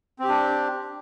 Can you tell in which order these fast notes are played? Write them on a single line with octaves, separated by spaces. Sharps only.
C4 G4 D4